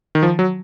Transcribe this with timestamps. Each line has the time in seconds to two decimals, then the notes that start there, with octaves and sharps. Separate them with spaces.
0.15 D#3
0.23 F3
0.39 F#3